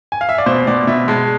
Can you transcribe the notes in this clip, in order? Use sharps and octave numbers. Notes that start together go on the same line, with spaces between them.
G#5
F5
E5
D5
B2 C5
B2 D5
B2 E5
G#3 A5